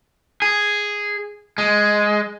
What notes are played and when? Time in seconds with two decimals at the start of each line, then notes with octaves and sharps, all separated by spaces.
0.42 G#4
1.58 G#3